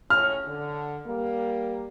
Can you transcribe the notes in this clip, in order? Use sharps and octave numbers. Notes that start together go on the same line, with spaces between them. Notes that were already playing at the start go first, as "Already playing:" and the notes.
A2 C#3 C#4 F6
D3
G3 A#3